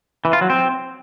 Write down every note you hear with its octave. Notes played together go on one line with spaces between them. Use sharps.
E3
F4
F#3
C4